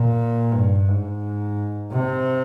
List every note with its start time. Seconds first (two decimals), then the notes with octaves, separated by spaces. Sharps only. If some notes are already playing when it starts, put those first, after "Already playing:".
Already playing: A#2
0.52 G2
0.88 G#2
1.93 C3